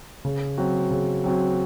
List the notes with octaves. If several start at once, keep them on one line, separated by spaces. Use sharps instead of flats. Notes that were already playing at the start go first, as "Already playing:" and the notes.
C#3
F#3 C4 F#4
C#3
F#3 C4 F#4